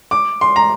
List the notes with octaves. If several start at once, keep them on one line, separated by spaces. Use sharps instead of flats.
D6
C6
A#5